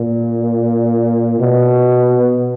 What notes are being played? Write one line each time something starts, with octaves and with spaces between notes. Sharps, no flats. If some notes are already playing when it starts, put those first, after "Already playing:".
Already playing: A#2
B2